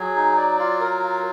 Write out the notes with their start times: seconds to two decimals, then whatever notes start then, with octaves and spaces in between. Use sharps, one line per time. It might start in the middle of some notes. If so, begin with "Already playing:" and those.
Already playing: F#3 G#4
0.16 D#4
0.37 D5
0.59 F4
0.80 A#4
1.03 F4